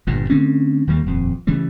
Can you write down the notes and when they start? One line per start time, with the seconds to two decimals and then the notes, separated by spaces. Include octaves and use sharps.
0.07 G1 G2 A#2
0.30 D3 A3 C4 C#4
0.87 D#2 D#3 G3 A#3
1.06 D#1 F2
1.47 C#3 E3 G3 A3